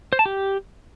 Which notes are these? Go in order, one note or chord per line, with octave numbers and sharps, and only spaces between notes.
C5
A5
G4